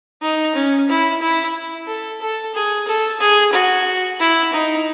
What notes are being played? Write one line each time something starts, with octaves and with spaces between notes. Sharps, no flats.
D#4
C#4
E4
E4
A4
A4
G#4
A4
G#4
F#4
E4
D#4